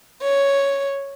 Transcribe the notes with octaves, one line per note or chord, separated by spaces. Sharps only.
C#5